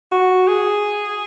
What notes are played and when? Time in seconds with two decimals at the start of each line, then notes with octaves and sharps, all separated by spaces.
0.12 F#4
0.48 G#4